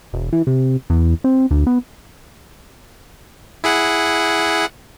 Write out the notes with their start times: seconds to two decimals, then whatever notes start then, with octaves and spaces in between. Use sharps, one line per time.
0.13 E1
0.33 E3
0.47 C3
0.90 E2
1.24 C4
1.51 D2
1.67 B3
3.64 E4 G#4 F#5